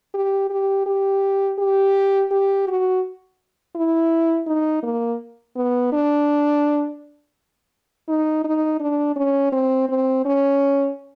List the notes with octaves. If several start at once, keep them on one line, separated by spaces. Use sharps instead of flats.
G4
G4
G4
G4
G4
F#4
E4
D#4
A#3
B3
D4
D#4
D#4
D4
C#4
C4
C4
C#4